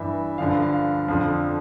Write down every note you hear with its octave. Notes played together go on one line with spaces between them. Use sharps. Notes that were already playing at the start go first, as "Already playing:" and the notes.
Already playing: G2 E3 E5
G2 D3 F3 F5
F5
F2 D3 F3